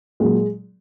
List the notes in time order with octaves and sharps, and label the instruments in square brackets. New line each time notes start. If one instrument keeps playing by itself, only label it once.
[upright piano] A#2 F#3 G#3